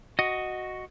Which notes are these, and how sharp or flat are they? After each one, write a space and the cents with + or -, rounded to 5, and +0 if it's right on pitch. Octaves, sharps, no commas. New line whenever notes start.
F#4 +0 D#5 +0